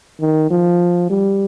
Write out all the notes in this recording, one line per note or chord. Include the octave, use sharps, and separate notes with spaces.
D#3
F3
G3